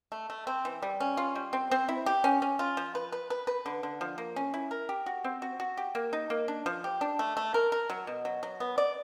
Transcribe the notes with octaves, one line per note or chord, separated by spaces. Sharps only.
A3
A3
C4
E3
G3
C#4
F4
G3
C4
C4
E4
G4
C#4
C#4
F4
F3
B4
B4
B4
B4
D3
D3
F3
A#3
C#4
E4
A#4
G4
F#4
C4
F#4
F#4
G4
A#3
D#4
A#3
D4
F3
G4
D4
A3
A3
A#4
A#4
F#3
B2
F#3
F#3
B3
D5